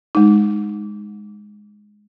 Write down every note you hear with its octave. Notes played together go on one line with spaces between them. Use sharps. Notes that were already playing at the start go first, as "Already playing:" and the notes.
G#3 D#4